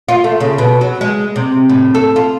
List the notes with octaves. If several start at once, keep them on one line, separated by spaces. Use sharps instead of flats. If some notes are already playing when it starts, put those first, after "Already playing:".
F4
A3
C#3
B2
F#3
G#3
C3
A2
A4
F4